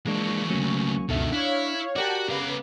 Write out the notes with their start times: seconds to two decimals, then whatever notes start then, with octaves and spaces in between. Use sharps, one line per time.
0.06 E3 F3 G#3 A#3 D4 C#6
0.50 C#2 F#3 A3 A#3 C#4
1.09 C#2 F#2 B2 D3 D#3 A4 E5
1.32 D4 E4 C#5 F5
1.96 F#4 G4 A#4 D5 F#5 G5 A5
2.29 C#3 B3 B4 F5 D6